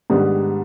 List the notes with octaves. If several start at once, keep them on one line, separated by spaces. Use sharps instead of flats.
G#2 D#3 G3 B3 D4